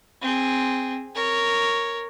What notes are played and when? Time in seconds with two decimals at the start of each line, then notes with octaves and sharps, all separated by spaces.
0.21 C4 G#4
1.15 A#4 C#5